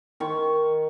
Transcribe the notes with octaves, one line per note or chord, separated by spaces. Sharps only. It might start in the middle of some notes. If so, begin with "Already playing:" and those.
D#3 C#6